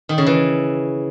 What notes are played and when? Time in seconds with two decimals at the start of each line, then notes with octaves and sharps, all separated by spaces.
0.09 D#3
0.18 C#3
0.26 E3